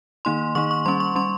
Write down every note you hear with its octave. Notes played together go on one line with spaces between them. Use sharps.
D#3 A#3 D#4 C6
D#3 A#3 D#4 C#6
C#6
G3 C#4 C6
C#6
G3 C#4 C6